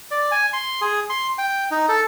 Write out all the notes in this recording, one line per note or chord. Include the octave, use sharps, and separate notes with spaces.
D5
G#5
C6
G#4
C6
G5
D#4
A4